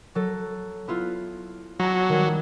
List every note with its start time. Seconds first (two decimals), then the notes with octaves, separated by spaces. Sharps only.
0.15 F#3 A4
0.88 B3 E4 F4
1.80 F#3 A5 A#5
2.09 D#3 G3